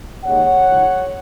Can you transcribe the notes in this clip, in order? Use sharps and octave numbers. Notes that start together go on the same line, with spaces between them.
D#2 C#3 G#3 D#4 C#5 F#5
C#2 C#3 F#3 D#4